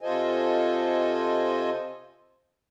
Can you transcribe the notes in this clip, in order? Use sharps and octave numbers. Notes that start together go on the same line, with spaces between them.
C3 F4 A4 C5 D#5 G#5